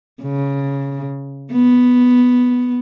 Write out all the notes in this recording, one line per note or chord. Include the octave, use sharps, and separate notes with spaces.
C#3
B3